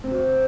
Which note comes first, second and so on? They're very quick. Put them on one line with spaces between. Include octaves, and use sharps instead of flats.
C4 C3 F#4